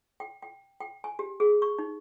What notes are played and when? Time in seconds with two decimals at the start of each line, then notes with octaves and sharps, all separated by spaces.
0.20 G5
0.42 G5
0.81 G5
1.04 G#5
1.19 G4
1.40 G#4
1.62 C#6
1.79 D#4